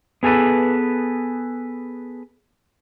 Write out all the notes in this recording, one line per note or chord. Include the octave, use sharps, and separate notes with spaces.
B3 G#4 A4 B4